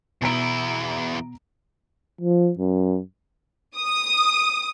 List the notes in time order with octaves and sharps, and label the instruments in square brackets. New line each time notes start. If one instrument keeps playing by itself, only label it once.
[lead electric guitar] E2 E4 [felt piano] B2 A#5 D7
[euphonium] F3
F#2
[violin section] D#6